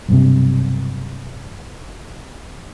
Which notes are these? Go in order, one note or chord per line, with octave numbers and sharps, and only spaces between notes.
B1 G2 C3